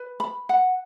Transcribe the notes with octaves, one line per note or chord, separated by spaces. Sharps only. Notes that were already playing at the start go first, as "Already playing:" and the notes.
Already playing: B4
B5
F#5